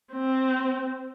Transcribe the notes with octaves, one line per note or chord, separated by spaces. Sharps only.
C4